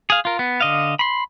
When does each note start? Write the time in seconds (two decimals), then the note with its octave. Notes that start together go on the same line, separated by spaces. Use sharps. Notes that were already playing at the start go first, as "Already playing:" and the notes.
0.10 G#4 F5
0.25 F4 A#4
0.39 B3
0.61 D3 D#5 F5
0.99 B5 C6